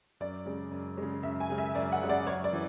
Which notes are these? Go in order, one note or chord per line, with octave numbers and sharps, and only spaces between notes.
F#2 D5
C#3 G#3
F#2
C#3 G#3
F#2 E5
G#5
C#3 G#3
E5
F#2 D5
F#5
C#3 G#3
D5
F#2 C#5
D5
E3